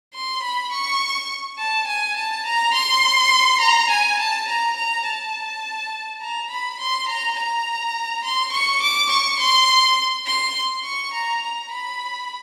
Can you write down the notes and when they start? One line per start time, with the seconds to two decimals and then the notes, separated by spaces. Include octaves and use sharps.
0.14 C6
0.43 B5
0.72 C#6
1.59 A5
1.87 G#5
2.17 A5
2.46 A#5
2.74 C6
3.61 A#5
3.90 G#5
4.19 A5
4.48 A#5
4.76 A#5
5.06 A5
6.21 A#5
6.51 B5
6.80 C6
7.09 A#5
7.37 A#5
8.25 C6
8.53 C#6
8.82 D6
9.10 C#6
9.39 C6
10.26 C6
10.84 C#6
11.13 A#5
11.43 A#5
11.72 B5